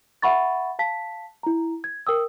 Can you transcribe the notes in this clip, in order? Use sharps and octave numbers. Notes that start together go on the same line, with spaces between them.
E5 F#5 B5 C#6 A6
F5 A5 B6
E4 A#5
G#6
A#4 G5 D#6 E6